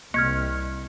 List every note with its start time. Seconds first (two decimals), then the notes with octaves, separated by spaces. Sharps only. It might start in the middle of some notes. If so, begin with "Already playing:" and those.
0.14 C2 A#3 F6 G#6 C#7